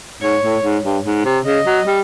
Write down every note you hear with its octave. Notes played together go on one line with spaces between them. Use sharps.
G#2 C#5
A2
G#2
G2
G#2
C3
C#3 D#5
F#3
G3